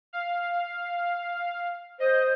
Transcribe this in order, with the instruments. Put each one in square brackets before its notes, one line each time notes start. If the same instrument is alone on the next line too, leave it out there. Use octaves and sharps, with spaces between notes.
[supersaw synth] F5
[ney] C5 [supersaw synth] D#5